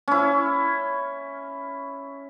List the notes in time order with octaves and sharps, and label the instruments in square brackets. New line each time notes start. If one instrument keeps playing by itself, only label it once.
[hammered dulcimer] C#4 E4